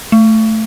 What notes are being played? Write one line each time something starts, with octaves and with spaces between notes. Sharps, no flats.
A3